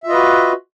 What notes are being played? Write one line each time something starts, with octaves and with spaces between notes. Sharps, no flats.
F4 F#4 B4 D#5 E5